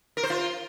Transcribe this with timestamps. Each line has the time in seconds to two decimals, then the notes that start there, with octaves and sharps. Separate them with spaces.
0.17 A#4
0.23 C5
0.30 F4